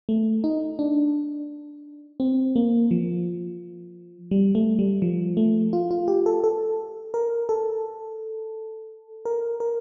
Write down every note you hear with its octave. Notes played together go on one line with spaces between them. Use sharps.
A3
D#4
D4
C4
A#3
F3
G3
A3
G3
F3
A3
F4
F4
G4
A4
A4
A#4
A4
A#4
A#4